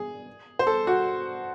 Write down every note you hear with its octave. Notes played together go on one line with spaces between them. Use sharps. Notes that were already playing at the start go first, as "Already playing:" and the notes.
Already playing: G#4
C5
A4
F#4